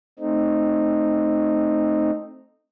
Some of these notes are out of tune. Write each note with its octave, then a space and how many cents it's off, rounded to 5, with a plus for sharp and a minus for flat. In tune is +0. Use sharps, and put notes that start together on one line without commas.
A3 +0 C4 +5 D#4 -10